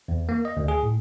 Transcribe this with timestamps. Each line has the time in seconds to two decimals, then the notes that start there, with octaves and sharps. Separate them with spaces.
0.08 E2
0.29 A#3
0.45 D#5
0.57 D2
0.68 G#4
0.83 A2